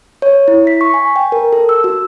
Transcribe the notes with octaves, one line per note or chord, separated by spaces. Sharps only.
C#5
E4
B6
C#6
G#5
G5
A#4
A4
E6
F#4